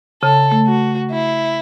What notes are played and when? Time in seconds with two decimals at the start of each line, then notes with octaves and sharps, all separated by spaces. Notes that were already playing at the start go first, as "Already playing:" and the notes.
0.23 C#3 A4
0.52 A3
0.67 F#4
1.11 E4